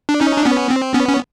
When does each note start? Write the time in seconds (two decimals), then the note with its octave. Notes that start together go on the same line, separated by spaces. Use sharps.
0.09 D4
0.21 C#4 D#4
0.37 D4
0.46 B3 C#4
0.70 C4
0.94 B3 C#4
1.08 C#4